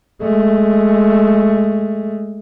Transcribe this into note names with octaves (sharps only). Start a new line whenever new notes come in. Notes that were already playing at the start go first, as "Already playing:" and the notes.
G#3 A3